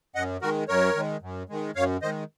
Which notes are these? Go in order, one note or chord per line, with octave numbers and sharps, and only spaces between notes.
F#2 D#5 F#5
D#3 G#3 F#4 A#4
F#2 A#4 C#5
D#3 G#3
F#2
D#3 G#3
F#2 C#5 F5
D#3 G#3 C5 D#5